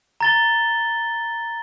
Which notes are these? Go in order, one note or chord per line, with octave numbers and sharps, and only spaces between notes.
A#5 A6 G7